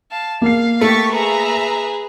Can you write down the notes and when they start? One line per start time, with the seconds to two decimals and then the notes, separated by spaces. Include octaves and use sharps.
0.11 F5 A5
0.42 A#3 F5 C7
0.81 A3 G4 C#6 A6 B6
1.12 G#4 B4 E5 A#5